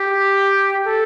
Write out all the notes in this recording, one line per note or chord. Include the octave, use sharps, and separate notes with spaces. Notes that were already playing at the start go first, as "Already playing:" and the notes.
Already playing: G4
A4